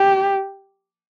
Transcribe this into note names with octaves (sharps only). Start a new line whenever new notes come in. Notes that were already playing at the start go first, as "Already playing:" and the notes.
Already playing: G4